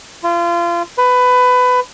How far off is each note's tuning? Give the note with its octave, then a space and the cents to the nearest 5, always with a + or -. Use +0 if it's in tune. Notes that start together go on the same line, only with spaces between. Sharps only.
F4 -30
B4 +20